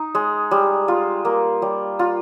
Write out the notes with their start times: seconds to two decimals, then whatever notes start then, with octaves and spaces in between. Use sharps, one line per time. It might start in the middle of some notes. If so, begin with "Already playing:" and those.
Already playing: D#4
0.15 G#3
0.51 G3
0.88 F4
1.25 A#3
1.62 G3
1.99 F4